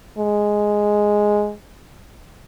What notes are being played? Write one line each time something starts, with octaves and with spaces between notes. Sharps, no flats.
G#3